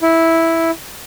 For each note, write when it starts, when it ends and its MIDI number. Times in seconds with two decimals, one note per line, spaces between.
0.02 0.71 64